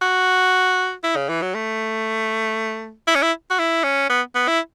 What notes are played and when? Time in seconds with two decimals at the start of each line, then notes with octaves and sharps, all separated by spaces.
0.01 F#4
1.03 E4
1.16 C#3
1.29 E3
1.42 F#3
1.55 A3
3.07 E4
3.15 C#4
3.22 E4
3.50 F#4
3.59 E4
3.84 C#4
4.10 B3
4.35 B3
4.48 E4